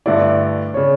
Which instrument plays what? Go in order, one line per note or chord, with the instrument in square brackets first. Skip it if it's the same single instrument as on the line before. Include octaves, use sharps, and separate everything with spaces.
[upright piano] G2 D3 A3 E4 [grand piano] D5
[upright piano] C#3 [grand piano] C#5